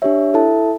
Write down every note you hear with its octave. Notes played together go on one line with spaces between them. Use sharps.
D4 G4 C#5 E5
E4 A4 E5 A5